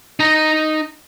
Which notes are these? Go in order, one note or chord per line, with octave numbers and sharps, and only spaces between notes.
D#4 A#5